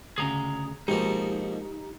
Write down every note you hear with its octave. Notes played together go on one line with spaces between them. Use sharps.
D2 C#3 G#4 A#5
B2 F3 G#3 A#3 D#4 G4